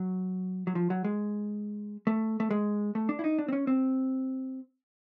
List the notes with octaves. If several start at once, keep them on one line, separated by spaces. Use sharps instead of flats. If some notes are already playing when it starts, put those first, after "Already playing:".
Already playing: F#3
F#3
F3
F#3
G#3
A3
A3
G#3
A3
D4
E4
D#4
D4
C4
C#4
C4